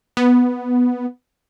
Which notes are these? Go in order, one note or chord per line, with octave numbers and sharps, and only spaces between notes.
B3